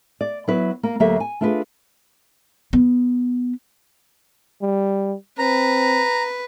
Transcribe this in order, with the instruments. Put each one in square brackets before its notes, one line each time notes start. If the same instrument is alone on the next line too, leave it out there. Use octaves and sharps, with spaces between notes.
[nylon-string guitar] D5
F#3 B3 E4 B4
A#3
D2 F#3 A#3 G4 A4 E5
G#5
A3 D4 F4 G#4 B4
[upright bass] B3
[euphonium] G3
[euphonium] C4 [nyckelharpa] B4 [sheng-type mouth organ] A#5